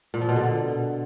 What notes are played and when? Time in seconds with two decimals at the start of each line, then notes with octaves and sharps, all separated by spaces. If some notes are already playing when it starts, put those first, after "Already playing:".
0.14 A#2
0.21 F3
0.29 B2
0.36 D3